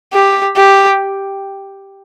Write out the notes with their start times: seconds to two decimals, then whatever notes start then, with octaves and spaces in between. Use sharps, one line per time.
0.13 G4
0.57 G4